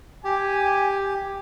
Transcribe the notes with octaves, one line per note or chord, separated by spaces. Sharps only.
G4 G#5